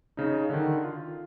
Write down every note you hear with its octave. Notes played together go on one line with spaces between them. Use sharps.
C#3 D#4
D3 D#3
F4